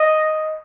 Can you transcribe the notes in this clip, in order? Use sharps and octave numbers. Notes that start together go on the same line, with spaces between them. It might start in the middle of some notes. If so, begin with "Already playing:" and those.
Already playing: D#5